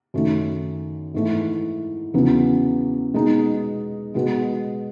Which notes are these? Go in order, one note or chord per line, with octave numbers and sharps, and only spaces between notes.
F#2 D#3 A3 D#4
G#2 E3 A3 E4
E2 C#3 F#3 B3
B2 G#3 D#4
B2 G#3 B3 F#4